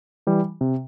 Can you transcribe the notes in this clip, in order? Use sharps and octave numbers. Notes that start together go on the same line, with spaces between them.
E3 G3
C3